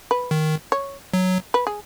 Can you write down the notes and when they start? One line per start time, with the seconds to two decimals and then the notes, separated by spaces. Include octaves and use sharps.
0.11 B4
0.31 D#3
0.72 C#5
1.14 F#3
1.54 B4
1.67 G#4